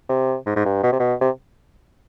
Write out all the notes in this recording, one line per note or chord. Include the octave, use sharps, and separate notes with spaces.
C3
G#2
G#2
G2
B2
C3
B2
C3